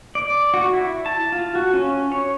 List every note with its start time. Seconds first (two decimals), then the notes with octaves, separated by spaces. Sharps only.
0.15 D5
0.54 F#4
0.73 E4
1.06 A5
1.32 F4
1.55 F#4
1.73 C#4
2.12 C#5